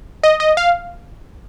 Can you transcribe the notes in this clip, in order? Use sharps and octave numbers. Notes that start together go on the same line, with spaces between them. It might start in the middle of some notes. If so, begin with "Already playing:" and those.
D#5
D#5
F5